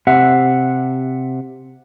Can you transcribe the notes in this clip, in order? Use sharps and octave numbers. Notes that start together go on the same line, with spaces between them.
C3 E5 F#5